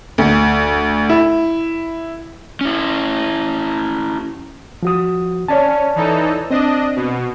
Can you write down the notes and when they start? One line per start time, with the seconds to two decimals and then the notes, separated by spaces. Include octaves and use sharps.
0.18 D2
1.09 E4
2.61 C#4 E4
4.83 F3 F#4 D#6
5.48 C#4 C#5 D5 A5
5.96 E3 D#4 A4
6.51 C4 D4 D#5
6.96 B2